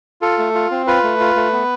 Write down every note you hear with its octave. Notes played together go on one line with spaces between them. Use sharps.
F4 A4
A3
F4
C4
F4 B4
A3
F4
A3
B3